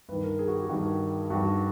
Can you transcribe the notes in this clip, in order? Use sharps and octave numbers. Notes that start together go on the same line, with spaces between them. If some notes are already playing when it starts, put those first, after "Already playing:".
G2 D#3 B4
A#4
G#4
F#4
G4
G2 D#3 F#4
G2 D#3 F#4